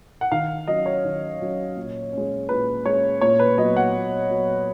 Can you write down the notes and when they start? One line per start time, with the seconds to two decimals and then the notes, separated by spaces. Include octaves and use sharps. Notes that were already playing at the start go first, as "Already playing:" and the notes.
0.21 F#5
0.32 D#3 F5
0.68 F#3 C#4 D#5
0.86 C#5
1.04 D#3
1.40 F#3 C#4
1.76 A#2
2.13 G#3 C#4
2.49 A#2 B4
2.86 G#3 C#4 C#5
3.21 A#2 C#5
3.39 B4
3.58 F#3 B3 D#5
3.77 F#5
3.94 A#2
4.31 F#3 B3